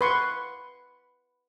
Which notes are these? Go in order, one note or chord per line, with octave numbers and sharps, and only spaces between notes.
B4 C6 C#6